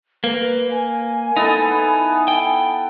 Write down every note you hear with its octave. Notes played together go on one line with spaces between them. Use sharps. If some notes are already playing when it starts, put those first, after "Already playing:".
A#3 B4
G#5
B3 D#4 E4 A4
G5